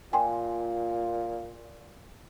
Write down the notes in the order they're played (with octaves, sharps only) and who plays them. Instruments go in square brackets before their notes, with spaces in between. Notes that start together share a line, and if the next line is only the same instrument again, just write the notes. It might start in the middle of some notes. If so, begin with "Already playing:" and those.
[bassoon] A#2 [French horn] F4 [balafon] G5 G#5 C6